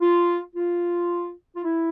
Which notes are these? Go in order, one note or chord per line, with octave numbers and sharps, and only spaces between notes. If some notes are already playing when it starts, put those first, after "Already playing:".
F4
F4
F4
E4